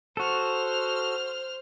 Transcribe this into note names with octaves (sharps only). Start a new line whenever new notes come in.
F#4 A4 C5 F6